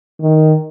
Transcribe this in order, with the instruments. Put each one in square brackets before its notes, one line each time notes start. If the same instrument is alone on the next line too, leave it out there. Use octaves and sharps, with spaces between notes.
[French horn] D#3